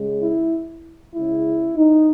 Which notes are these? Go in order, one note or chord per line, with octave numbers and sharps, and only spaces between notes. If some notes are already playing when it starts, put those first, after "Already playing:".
Already playing: C#3 G#3
E4
C#3 G#3 E4
D#4